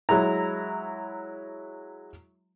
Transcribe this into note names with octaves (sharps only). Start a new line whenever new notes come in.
F#3 G#3 E4 A#5